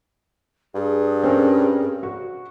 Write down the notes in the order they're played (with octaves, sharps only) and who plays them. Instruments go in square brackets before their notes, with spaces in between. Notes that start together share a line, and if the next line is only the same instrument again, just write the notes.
[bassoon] G2 [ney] G#4
[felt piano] C4 C#4 A#4
F#4